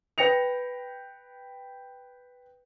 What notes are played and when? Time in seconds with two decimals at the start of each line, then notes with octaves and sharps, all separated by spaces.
0.18 B4 G5 A#6 C#7 F7